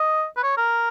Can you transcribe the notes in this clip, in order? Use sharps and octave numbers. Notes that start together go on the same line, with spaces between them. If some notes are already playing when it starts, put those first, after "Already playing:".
Already playing: D#5
B4
C#5
A#4